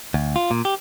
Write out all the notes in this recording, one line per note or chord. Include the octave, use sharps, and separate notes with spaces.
D2
F4
A#2
G4